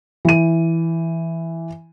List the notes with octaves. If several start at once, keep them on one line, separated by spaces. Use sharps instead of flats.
E3 D#7